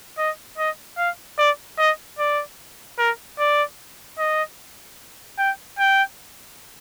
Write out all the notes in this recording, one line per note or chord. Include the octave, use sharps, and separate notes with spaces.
D#5
D#5
F5
D5
D#5
D5
A#4
D5
D#5
G5
G5